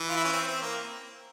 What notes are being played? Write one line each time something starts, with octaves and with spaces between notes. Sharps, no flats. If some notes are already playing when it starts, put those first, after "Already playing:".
Already playing: E3
F4
E4
C#4
C4
C4
A#3